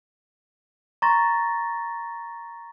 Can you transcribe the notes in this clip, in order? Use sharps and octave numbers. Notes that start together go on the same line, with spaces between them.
A#5 C6 C#6 A6 A#6